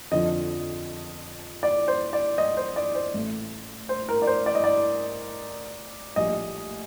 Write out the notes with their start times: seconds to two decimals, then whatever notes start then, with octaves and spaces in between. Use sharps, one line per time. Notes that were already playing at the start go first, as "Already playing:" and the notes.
0.11 F2 D3 F3 D#5
1.63 D5
1.88 C5
2.13 D5
2.38 D#5
2.57 C5
2.76 D5
2.95 C5
3.14 A1 A2 A3
3.89 C5
4.09 A#4
4.22 D5
4.27 C5
4.46 D5
4.55 D#5
4.64 D5
6.16 A#1 A2 G3 D#5